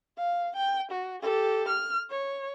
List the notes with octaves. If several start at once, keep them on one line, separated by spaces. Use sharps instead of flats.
F5
G5
F#4
G4 A4
F6
C#5